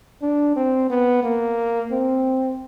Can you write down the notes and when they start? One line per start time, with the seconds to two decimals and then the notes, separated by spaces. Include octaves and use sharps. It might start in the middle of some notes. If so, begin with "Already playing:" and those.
0.22 D4
0.56 C4
0.90 B3
1.24 A#3
1.92 C4